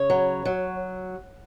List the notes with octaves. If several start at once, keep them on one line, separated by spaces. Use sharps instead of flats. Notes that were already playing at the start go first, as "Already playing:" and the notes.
Already playing: C#3 C#5
F#3
F#3